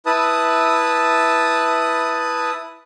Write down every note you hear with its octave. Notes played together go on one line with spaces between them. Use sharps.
E4 B4 A5 D#6